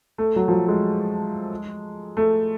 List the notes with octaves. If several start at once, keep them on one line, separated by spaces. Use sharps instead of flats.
A3
F#3
F3
F#3
G#3
A3